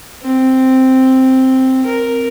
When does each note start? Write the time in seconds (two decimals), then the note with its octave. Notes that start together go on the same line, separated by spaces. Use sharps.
0.23 C4
1.86 A#4